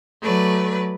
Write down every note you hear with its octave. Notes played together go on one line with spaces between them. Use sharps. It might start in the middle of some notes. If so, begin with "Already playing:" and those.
F#3 A3 B4 D5